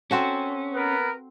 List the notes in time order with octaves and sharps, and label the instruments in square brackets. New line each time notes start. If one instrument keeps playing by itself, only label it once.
[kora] C4 F#4 A4 [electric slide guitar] C#4
[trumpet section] B3 A#4 B4